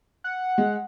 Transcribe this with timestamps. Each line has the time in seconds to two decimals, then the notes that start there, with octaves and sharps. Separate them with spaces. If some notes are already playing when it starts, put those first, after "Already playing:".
0.24 F#5
0.58 G#3